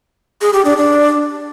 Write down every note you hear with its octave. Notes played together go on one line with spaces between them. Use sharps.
G#4
G4
D4
D4